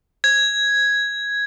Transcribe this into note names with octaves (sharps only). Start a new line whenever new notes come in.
G#6